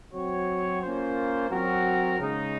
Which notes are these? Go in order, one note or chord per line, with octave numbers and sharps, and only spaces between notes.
F#3 C4 F#4 C#5
A#3 C#4 F4 C5
F#3 C4 F#4 A#4
C#3 G#3 D#4